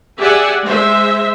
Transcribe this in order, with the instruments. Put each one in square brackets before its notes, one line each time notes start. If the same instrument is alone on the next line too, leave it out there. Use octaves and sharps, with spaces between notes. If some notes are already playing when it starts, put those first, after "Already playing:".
[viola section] G4 G#4 D5 E5 F#5 G#5
G#3 C5 E5